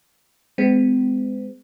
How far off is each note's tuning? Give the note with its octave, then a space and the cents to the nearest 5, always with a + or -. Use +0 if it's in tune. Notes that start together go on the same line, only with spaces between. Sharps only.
G#3 +0 C4 -45